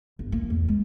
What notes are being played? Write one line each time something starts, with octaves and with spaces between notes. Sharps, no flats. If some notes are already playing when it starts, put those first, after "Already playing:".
G1
A#3
E2
G#3